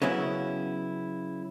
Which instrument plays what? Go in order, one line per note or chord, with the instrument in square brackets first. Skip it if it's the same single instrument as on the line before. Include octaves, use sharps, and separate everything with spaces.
[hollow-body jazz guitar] C#3 F#3 B3 C#4 E4